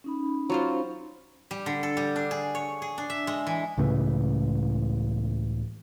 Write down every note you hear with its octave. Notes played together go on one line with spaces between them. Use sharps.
C#4 D#4 B5
F#3 F4 C5
G3
D3
A4
G3
D4
G#4
C#5
G#4
D4
E5
G#3
E3
C#2 A2 C#3 E3